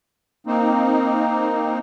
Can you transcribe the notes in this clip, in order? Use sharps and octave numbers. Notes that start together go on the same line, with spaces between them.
A#3 C4 D#4